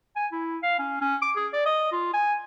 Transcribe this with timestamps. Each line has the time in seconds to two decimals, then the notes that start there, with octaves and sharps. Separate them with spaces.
0.16 G#5
0.32 E4
0.63 F5
0.79 C#4
1.01 C#4
1.22 D6
1.36 G#4
1.53 D5
1.66 D#5
1.92 F4
2.14 G#5